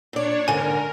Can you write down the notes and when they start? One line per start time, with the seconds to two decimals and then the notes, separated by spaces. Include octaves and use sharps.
0.13 A#2 D4 C#5 D5
0.48 D#2 G#2 D3 A#4 G#5